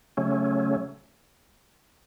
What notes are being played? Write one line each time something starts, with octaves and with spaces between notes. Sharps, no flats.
C#3 F#3 A3 C#4